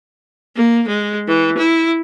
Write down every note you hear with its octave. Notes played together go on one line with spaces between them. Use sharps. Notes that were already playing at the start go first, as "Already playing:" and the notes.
A#3
G#3
E3
E4